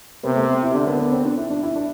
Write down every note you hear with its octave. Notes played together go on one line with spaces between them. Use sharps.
C3 B3
A3
E4
D3 D4
B3
B3
C4
D4
E4
D4
E4
D4